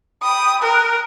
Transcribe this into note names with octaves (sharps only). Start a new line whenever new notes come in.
G5 B5 D#6
A#4 F#6